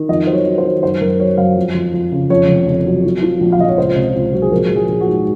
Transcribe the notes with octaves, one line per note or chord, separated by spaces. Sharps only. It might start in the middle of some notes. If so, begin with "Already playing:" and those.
Already playing: D#3
F2 D#5
F#3 C5
C#5
F#3
C5
D#3
F#2 C5
F#2 A#4
F#3 C#5
F#2 F5
F2
F2
F2
C#3
F2 C#5
F1
F1
F#3
F3
F3
A#1
F5
A#1 D#5
C#5
C#2 C5
C3
C#2
F#3
G#4
A#1 A#4
A#1
G#4
A#1
F#4
G#2